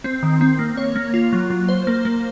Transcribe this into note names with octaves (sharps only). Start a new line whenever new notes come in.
C4
D#3
C4
A#3
C#5
A#3
F4
F#3
F#3
C5
A#3
A#3